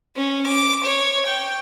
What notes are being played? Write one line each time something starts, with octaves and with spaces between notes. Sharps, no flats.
C#4
D6
C#5
G5